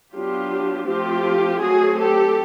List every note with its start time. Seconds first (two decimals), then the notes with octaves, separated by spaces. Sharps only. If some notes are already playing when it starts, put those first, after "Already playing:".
0.14 F#3 B3 D4 F4 G4
0.87 F3 A3 C4 F4 G4
1.61 F#3 A3 C4 F#4 G#4
1.97 G4 A4